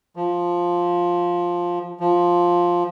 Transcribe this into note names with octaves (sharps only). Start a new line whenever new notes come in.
F3
F3